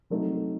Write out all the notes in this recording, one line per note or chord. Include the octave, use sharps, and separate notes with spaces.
C3 F#3 A3 D#4